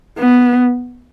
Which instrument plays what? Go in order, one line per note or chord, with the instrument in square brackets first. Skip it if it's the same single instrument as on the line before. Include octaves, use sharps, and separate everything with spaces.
[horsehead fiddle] B3